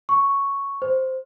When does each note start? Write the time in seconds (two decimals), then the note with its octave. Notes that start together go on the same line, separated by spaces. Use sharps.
0.09 C#6
0.82 C5